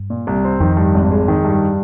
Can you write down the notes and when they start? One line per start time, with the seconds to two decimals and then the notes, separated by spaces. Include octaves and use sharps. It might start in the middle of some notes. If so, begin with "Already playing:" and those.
Already playing: G2
0.10 A#2
0.27 C2
0.44 C4
0.60 F2 D#3
0.77 G2
0.94 G#1
1.11 G#3
1.28 D#3
1.45 G2